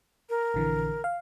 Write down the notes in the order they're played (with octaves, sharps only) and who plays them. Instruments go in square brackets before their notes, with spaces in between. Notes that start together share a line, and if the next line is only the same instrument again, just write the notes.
[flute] A#4
[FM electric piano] A#1 D3 E3
F5